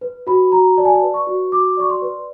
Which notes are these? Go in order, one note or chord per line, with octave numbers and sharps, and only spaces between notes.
B4
F#4 B5
F#4 A#5
D5 A5
G#5
A5
B4
C#6
F#4
F#4 D6
D5 C#6
C6
B4